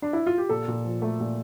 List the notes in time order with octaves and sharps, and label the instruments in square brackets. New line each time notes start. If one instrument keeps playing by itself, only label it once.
[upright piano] D4
E4
F4
G4
A#2 A4
A#2
F3
A3
A#2